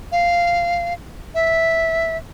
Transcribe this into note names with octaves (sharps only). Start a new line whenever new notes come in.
F5
E5